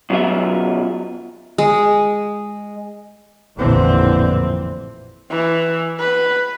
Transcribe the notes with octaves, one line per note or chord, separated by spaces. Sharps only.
F#2 B2 F#3 F4 E5
G#3
A1 F2 A#2 D3 E3 C4
E3
B4